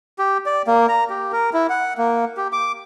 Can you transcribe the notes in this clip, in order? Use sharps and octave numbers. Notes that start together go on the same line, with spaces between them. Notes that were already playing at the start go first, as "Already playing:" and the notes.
G4
D5
A#3
A#5
G4
A#4
E4
F#5
A#3
G4
D6